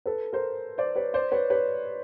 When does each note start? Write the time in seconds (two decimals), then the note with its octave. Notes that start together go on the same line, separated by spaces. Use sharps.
0.06 A4 B4
0.33 A#4 C5
0.78 C5 D5
0.96 B4 C#5
1.14 C5 D5
1.32 B4 C#5
1.50 B4 C#5